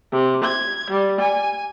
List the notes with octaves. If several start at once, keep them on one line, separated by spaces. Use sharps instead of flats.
C3
G#6
G3
G#5